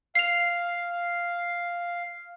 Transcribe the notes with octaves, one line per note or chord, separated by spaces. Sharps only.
F5 C7 F7